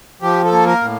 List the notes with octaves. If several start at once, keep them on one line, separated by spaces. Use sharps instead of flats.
F3 G4
A4
A#3
A#4
A2